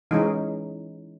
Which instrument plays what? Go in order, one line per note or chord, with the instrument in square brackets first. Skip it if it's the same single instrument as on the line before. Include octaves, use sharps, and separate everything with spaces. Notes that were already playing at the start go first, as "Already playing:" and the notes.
[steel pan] E3 G#3 C#4 D#4